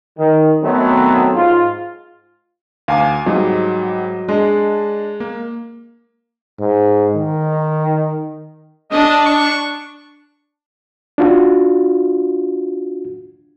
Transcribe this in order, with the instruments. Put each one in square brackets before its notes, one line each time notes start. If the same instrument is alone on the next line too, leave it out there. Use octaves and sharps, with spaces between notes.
[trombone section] D#3
D#3 F#3 A3 B3 C4
G#2 F4
[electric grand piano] D2 [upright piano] F5 G#5 D6
[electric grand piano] G#2 G3 [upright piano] F#3 D#5
[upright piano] G#3 [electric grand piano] D4
[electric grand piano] A#3
[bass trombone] G#2
D#3
[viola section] D4 [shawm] D#5
[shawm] C#6
[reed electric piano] D4 F4 F#4